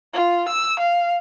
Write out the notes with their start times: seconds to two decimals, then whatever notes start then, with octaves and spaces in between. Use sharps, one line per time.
0.14 F4
0.48 E6
0.79 F5